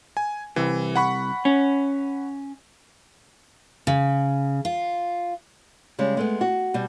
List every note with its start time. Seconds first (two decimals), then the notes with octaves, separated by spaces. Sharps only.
0.17 G#5
0.56 C2 E3
0.95 F#5 B5 C#6
1.45 C#4
3.87 C#3
4.65 F4
5.99 C#3 G3 G#3
6.17 G#3 A3 B3
6.41 F#4
6.74 B2 G3